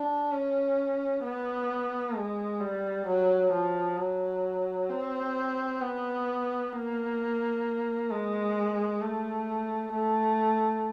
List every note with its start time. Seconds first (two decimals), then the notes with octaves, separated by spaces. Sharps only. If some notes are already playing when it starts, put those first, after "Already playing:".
Already playing: D4
0.32 C#4
1.24 B3
2.16 G#3
2.61 G3
3.07 F#3
3.53 F3
3.98 F#3
4.89 C4
5.81 B3
6.72 A#3
8.11 G#3
9.01 A3
9.93 A3